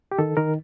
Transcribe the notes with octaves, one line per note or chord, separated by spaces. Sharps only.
G4
D#3 A4
D#3 A#4